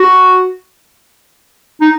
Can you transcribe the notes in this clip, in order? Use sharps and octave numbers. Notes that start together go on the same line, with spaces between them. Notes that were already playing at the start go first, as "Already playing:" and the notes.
Already playing: F#4
D#4